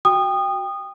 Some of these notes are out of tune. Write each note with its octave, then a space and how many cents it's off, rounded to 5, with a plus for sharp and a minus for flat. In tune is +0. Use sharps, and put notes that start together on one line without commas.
F#4 +0 G5 +15 D#6 -20